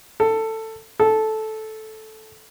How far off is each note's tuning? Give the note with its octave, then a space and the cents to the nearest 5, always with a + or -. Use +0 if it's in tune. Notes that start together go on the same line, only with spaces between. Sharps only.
A4 +15
A4 -10